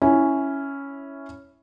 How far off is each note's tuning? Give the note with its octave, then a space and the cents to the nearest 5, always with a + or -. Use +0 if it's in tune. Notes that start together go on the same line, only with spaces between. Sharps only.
C#4 +0 E4 -5